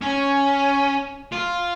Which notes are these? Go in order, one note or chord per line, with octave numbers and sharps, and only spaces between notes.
C#4
F4